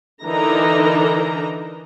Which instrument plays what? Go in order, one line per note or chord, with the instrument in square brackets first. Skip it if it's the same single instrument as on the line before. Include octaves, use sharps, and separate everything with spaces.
[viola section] D3 E3 D4 D#4 A#4 A#5